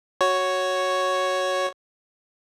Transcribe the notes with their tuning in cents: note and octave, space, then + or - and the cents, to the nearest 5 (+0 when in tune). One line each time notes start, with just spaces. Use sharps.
F#4 +0 C#5 +0